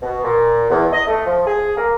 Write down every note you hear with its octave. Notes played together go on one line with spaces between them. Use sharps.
B2
A#2
E2
D#5
A3
F3
G#4
A#3